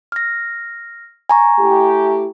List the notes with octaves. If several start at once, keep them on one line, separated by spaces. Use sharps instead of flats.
F6 A#6
G#5 A#5 C#6
A3 E4 G4